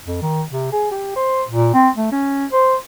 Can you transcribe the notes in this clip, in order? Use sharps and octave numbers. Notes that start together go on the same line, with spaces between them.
F2
D#3
C3
G#4
G4
C5
A#2
C4
A3
C#4
C5